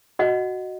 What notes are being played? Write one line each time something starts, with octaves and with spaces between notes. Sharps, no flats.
F#4 D#5 F#5